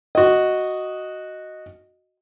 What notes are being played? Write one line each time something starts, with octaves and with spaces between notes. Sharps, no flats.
F#4 D#5